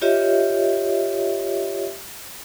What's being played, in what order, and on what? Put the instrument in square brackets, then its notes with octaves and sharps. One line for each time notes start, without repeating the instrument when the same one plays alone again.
[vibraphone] F4 G4 C#5 D#5 E5